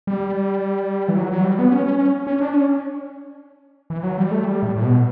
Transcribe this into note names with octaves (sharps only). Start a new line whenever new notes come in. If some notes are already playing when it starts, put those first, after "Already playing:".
G3
E3
F#3
F#3
G3
B3
C#4
C#4
C#4
C#4
D4
C#4
E3
F#3
G3
A3
G3
A2
A2
B2